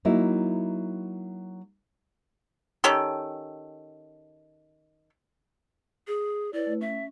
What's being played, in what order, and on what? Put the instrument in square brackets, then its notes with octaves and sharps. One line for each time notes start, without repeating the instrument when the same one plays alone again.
[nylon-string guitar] F#3 A#3 D#4 E4
[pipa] D#3 C#4 G4 A4
[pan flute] G#4
[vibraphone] E4 B4 C#5 [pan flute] D5
[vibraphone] A3
[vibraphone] C#4 [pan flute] E5